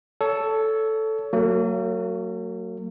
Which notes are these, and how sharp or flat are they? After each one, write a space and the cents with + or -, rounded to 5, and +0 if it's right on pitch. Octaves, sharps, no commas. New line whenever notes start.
A4 +0 C#5 +25
F#3 +0 A#3 -40